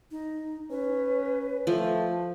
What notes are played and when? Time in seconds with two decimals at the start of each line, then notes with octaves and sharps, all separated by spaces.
0.11 D#4
0.71 C#4 B4
1.67 F3 A3